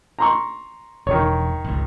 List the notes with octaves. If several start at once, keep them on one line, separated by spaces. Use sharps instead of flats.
A#5 C6 C#6
E1 D#3 C#5
G#1 C#2